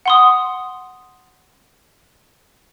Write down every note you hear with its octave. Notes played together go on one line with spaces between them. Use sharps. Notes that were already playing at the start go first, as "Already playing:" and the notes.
F#5 C6 D#6